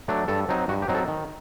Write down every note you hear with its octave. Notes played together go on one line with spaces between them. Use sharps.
F#3 A3 D4
G2 A4
F#3 C4 D#4
G2 F#4
G4
F#3 C4 D#4
A4
D#3